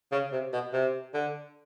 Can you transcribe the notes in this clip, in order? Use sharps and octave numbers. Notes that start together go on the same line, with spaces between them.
C#3
C3
B2
C3
D3